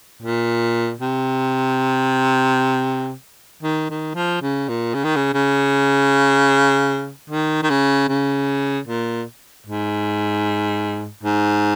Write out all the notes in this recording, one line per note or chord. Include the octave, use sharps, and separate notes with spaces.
A#2
C3
D#3
D#3
F3
C#3
A#2
C#3
D#3
C#3
C#3
D#3
D#3
C#3
C#3
A#2
G#2
G#2